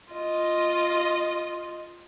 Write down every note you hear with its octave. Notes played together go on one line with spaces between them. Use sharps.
F4 D#5